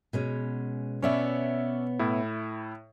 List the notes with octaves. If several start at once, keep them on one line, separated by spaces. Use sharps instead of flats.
B2 G#3 C#4
B2 B3 C#4 C#5 D5 E5
A2 E4